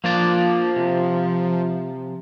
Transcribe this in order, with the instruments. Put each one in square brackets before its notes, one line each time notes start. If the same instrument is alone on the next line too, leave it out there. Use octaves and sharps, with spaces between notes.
[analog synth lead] F3 [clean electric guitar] A#3 D4 D5
[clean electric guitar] C3